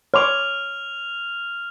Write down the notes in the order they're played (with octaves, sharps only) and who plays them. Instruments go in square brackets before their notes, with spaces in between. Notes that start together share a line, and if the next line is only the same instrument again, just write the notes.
[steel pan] C#5 C6 D6 [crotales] F6 F7